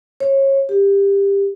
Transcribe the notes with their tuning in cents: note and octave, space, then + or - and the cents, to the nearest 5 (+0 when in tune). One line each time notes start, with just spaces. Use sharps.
C#5 -30
G4 +20